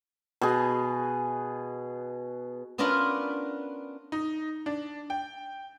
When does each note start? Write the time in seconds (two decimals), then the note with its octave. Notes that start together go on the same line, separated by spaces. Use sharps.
0.41 B2 G#4
2.78 B3 C#4 D4 F4 A#4 B4
4.12 D#4
4.66 D4
5.10 G5